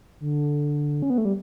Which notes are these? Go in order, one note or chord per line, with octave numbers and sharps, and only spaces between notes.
D3
C#4
B3
A3
G3